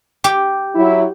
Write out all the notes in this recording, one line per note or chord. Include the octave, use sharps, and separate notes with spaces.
G4
F#3 E4